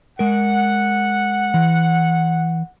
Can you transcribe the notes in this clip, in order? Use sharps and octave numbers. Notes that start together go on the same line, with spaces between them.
G#3 A#4 F#5
E3